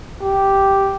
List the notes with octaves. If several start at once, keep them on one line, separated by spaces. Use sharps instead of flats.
G4